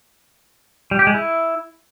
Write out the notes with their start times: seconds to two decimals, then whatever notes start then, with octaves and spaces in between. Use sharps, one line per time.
0.91 G3
0.99 G4
1.07 G#3
1.14 E4